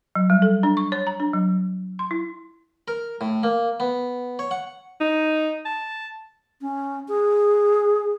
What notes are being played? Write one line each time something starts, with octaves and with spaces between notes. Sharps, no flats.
F#3
G3
A4
D4
C#6
C#5
A#5
D4
F#3
C6
E4
A#4
A2
A#3
B3
C#5
F#5
D#4
A5
C#4
G#4